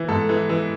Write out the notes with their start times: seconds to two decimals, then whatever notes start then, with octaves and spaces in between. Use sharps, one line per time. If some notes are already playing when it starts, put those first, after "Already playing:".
Already playing: E3
0.08 G#2 A4
0.29 E3
0.49 E3